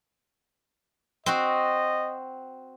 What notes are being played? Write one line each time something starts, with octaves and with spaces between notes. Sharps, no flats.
C4 F#4 C5 D#5